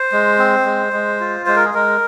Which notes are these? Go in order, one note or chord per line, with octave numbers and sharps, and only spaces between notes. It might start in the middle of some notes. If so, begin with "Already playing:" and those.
Already playing: C5
G#3
C4
G#3
G#3
F4
G#3 C5
A#4
G#4
G#3 A#4